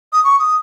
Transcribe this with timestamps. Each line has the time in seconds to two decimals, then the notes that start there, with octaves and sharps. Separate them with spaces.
0.13 D#6
0.24 C#6
0.39 D#6